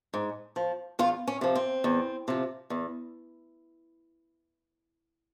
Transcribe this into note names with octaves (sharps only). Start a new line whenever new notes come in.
G#2
F3
E2 F4
C#4
C3 F3
C4
E2
C3 F3
E2